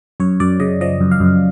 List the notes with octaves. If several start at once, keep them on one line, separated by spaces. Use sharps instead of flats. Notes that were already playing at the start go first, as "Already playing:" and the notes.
F#2 C#5
F#2 D5
C#3 D#5
F3 D#5
F#2
F5
F#2